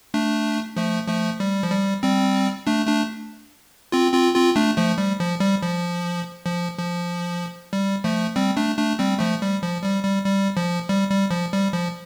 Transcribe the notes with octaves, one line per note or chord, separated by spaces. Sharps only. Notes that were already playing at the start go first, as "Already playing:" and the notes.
A3 D4
F3 A3
F3 A3
G3
F3
G3
G3 C4
A3 D4
A3 D4
C4 F4
C4 F4
C4 F4
A3 D4
F3 A3
G3
F3
G3
F3
F3
F3
G3
F3 A3
G3 C4
A3 D4
A3 D4
G3 C4
F3 A3
G3
F3
G3
G3
G3
F3
G3
G3
F3
G3
F3